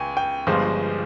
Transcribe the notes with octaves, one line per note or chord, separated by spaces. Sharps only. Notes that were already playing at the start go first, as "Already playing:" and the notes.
Already playing: C#2 G5 G#5
G5
G1 G2 F3 G#3 C5